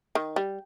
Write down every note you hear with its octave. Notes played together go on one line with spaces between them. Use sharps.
D#3
G3